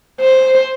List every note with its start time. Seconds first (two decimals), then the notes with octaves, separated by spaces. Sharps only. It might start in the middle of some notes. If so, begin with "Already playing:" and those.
0.20 C5